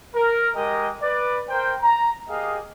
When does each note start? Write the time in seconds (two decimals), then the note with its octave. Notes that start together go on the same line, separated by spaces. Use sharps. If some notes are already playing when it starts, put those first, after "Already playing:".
0.15 A#4
0.56 G#3 G4 A#4 D#5
1.03 B4 D5
1.49 A#4 C5 G5
1.82 A#5
2.29 A#3 G4 G#4 D#5 F5